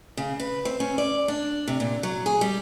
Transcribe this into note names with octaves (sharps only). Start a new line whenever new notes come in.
C#3
B4
C4
C#4
D5
D4
C3
A#2
F#3
G#4
G3